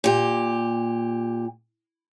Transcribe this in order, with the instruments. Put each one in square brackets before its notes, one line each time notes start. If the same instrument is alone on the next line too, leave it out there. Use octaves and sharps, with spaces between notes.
[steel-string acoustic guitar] A#2 G4